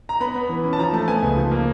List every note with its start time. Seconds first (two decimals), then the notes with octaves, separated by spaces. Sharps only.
0.09 A#5
0.20 B3 B5
0.36 B3
0.49 E3
0.64 C#4
0.73 A5
0.79 F3 A#5
0.93 A3 A5
1.08 B3 G#5
1.23 C#2
1.37 F3
1.51 A#3